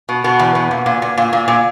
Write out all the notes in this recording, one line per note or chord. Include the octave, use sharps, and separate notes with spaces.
B2
B2 B3
E2
B2
A#2
A#2
A#2
A#2
A#2
A#2